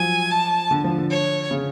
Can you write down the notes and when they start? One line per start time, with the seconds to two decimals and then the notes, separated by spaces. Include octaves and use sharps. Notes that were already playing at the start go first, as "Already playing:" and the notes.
Already playing: F3 F#3 G#5
0.31 A5
0.71 D3
0.84 F3
0.98 D3
1.11 C#5
1.51 C#3